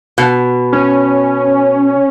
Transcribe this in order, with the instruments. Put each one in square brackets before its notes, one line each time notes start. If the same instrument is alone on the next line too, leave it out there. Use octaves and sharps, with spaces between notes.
[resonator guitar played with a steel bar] B2
[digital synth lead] C#4